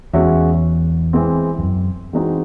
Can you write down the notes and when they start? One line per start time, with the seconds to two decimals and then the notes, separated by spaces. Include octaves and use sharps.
0.13 E2 G#3 C#4 F#4 C#5 E5
1.13 E3 G#3 C4
1.58 E2
1.63 F#2
2.13 E3 G#3 C4 D#4 F#4